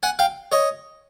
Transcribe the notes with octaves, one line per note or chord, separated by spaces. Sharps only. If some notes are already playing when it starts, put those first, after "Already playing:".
F#5 G#5
F5 G5
C#5 D#5